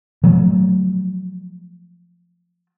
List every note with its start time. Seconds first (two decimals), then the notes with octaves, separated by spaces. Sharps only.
0.24 F3 F#3 A3